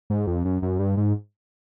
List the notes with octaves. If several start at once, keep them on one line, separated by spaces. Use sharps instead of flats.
G#2
F2
F#2
F#2
G2
G#2